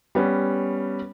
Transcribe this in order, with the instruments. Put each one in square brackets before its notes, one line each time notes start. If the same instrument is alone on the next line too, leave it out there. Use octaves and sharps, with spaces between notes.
[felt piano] G3 B3 C#4